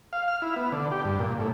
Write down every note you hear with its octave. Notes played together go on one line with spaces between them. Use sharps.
F5
F6
E4
B3
D3
G4
G2
A#2
A2